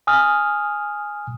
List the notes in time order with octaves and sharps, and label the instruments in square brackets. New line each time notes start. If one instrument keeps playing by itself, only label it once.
[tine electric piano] G#5 D#6 F6